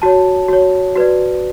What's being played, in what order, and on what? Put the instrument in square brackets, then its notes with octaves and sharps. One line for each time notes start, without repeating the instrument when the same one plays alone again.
[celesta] F#4 C#5 A5
F#4 C#5
F#4 B4 D5